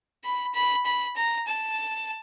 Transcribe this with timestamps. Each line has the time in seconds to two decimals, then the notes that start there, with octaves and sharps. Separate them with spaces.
0.24 B5
0.54 B5
0.86 B5
1.17 A#5
1.47 A5